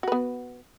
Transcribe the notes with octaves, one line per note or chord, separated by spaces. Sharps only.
B3 F#4 B4